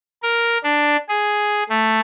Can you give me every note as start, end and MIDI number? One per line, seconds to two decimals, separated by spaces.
0.23 0.58 70
0.64 0.97 62
1.09 1.63 68
1.69 2.00 57